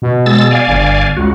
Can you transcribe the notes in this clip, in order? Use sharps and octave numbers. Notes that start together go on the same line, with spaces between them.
B2
G#3 E6 A6
D5 F5 G#5
G1
C#2 F#4